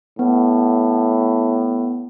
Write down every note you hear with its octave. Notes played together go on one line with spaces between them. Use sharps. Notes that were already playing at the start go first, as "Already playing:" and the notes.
A2 B3